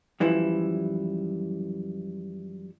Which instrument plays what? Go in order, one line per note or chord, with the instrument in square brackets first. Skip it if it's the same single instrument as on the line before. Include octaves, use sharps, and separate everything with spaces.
[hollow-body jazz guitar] F#2 E3 F3 G3 E4